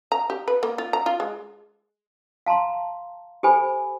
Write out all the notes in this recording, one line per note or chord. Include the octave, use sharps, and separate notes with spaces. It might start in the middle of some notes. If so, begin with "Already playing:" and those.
A#5
G4
B4
A#3
F4
A#5
F4
G#3
F5 A5 A#5 C6
G4 A4 C5 G#5 B5